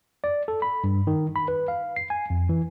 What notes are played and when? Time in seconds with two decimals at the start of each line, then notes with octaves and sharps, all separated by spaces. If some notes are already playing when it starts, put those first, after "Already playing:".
0.24 D5
0.48 A4
0.62 B5
0.84 G2
1.07 D#3
1.36 B5
1.48 B4
1.68 F5
1.96 C7
2.10 G#5
2.30 F2
2.49 E3